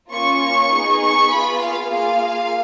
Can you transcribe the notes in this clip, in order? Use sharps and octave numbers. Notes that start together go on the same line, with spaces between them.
A#3 C#4 F4 C#6
B3 D#4 G#4
C#6
B3 F4 G#4 B5
F5
A#3 F4 G#4 F5